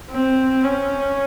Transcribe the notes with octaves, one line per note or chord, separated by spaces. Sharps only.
C4
C#4